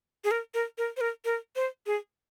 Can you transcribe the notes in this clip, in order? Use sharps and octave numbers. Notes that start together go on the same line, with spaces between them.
G#4
A#4
A#4
A#4
C5
A#4
A#4
C5
G#4